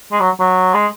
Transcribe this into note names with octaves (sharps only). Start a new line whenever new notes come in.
G#3
F#3
F#3
G#3